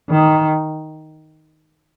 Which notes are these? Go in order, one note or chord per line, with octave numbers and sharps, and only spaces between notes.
D#3